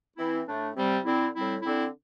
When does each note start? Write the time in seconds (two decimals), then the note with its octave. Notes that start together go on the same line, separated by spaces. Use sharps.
0.17 E3 C4 E4
0.46 A2 A3 D4
0.75 C3 G3 C4
1.04 D3 C4 E4
1.33 A2 G3 C4 E4
1.62 D3 C4 E4